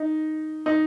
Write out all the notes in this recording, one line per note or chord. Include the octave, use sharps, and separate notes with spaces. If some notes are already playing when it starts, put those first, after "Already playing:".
Already playing: D#4
D#4